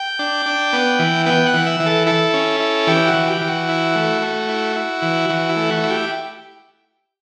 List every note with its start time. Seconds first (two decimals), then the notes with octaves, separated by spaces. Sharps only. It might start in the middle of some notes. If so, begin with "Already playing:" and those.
Already playing: G5
0.19 D4
0.46 D4
0.73 B3
0.99 E3
1.26 B3 G5
1.46 F#5
1.54 E3
1.67 E5
1.80 E3
1.86 A4
2.06 E4 A4
2.34 C#4
2.60 E4
2.87 E3 G4
3.07 F#4
3.14 E3
3.27 G4
3.41 E3
3.48 F#4
3.69 E4
3.96 A3
4.22 A3
4.48 E4
4.76 E4
5.02 E3
5.29 E3 F#4
5.49 E4
5.56 A3
5.70 F#4
5.83 E4
5.90 G4